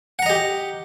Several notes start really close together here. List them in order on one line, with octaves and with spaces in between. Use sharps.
F#5 A#5 D#5 G4